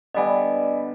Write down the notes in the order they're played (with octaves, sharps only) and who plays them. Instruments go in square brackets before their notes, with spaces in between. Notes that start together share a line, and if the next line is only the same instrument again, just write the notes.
[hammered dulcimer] D3 G3 B3 [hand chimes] D#5 G#5